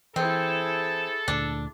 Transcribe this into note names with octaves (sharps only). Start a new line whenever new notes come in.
E3 C4 E4 G#4 A4
D2 A#2 D3 D4